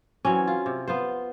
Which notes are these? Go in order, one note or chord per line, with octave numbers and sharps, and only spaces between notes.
E3 F#3 C4 C#4
F4
C3
B3 F4 C5